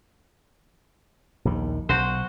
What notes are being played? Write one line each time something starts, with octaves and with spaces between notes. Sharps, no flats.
A#1 D#2 D#3
B1 F#4 C5